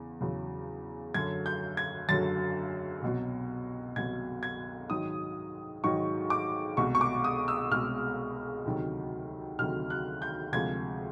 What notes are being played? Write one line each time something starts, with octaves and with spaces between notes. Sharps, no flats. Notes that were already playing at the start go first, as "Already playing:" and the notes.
Already playing: E2 C#3
E2 C#3 F#3
F#2 D3 F#3 G#6
G6
G#6
F#2 D3 F#3 A6
C2 B2 F#3
C2 B2 F#3 G#6
G#6
G#2 D#3 F#3 D#6
G#2 D#3 F#3 C#6
D6
C2 B2 G#3 C#6
C#6
D6
D#6
E6
C2 B2 G#3 F6
D2 C3 D#3 F#3
D2 C3 D#3 F#3 F6
F#6
G6
D2 C3 F3 G#3 G#6